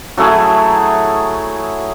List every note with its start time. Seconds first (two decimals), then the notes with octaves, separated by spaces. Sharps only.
0.17 F#3 A3 E4 G#4